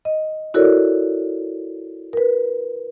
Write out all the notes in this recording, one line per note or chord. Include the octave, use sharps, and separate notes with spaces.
D#5
E4 F#4 A4 A#4 C#5 D5
A#4 B4